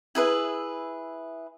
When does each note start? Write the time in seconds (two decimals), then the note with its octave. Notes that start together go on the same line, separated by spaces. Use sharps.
0.15 E4 G#4 B4 E5